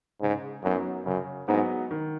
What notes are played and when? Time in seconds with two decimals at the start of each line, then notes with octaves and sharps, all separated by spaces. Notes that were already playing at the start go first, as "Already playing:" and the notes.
0.21 G#2 C#3
0.63 F#2 F#3 B3 D#4 F#4
1.06 F#2 C#3
1.48 G#2 F#3 B3 D#4 F#4
1.91 D#3